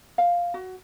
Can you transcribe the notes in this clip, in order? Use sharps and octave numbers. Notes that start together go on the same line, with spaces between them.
F5
F#4